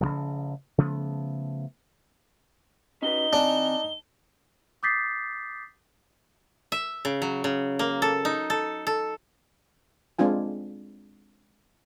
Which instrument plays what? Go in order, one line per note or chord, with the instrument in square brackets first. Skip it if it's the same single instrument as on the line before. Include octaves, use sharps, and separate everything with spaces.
[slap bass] A1 C#3 E3 F3
C#3 F3 A3 B3
[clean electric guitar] C#4 F#4 B4 [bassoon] D#4 [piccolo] G7
[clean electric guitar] D#3 C4 G#5 [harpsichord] D4
[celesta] D6 D#6 G6 A6 B6 C7
[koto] E5
C#3
F#3
C#3
A#3
A4
D#4
A4
A4
[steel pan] G#3 C4 D4 F4 G#5